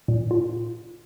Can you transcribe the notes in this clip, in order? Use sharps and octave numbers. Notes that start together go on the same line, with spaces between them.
A#2
F4